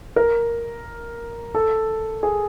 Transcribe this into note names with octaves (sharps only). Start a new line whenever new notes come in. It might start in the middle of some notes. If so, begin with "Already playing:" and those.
A#4
A4
G#4